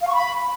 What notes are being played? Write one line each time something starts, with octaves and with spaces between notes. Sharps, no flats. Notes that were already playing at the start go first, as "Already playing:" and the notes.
F5
C#6
B5